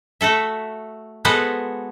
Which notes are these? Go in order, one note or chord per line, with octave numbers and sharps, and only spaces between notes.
A3 F#4 A4 E5
G#3 B3 F#4 A4 B4 C5